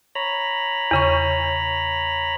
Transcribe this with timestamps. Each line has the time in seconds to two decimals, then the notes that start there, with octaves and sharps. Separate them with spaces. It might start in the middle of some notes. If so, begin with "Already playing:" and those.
0.15 C#5 A#5 B5
0.91 E2 C#3 C#6